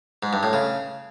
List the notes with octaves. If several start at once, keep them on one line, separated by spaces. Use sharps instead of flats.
G#2
G2
A2
C#3